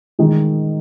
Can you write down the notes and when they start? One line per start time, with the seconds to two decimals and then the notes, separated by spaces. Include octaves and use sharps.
0.19 D#3 G#3 D#4